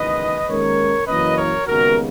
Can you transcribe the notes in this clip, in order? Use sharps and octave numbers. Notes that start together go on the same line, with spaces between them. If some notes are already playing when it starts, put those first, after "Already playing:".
Already playing: F#1 E2 D#3 G#3 B4 D#5
D#2 D#3 G#3 C#4 A#4 C#5
F#1 F#2 E3 A#3 C#4 B4 D#5
A#4 C#5
D#2 C#3 G#3 B3 F#4 A#4